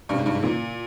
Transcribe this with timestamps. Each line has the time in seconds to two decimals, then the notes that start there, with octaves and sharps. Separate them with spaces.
0.09 G2 C3 G3 C#4
0.18 G#2
0.26 G2
0.35 G#2
0.42 A#2 C#3 E3 A#3